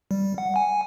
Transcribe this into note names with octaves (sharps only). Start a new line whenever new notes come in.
G3
F#5
G#5